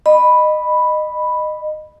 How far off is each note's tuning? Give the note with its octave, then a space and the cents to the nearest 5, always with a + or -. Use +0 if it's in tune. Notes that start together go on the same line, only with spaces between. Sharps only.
D#5 -25 B5 +0